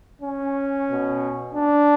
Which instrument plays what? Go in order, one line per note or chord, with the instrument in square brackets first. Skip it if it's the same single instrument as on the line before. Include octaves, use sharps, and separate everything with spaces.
[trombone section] C#4
B2
D4